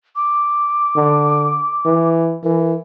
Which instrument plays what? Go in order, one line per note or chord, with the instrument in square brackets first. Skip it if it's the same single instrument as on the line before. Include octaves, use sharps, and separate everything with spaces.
[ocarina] D6
[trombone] D3
E3
[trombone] E3 [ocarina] A#4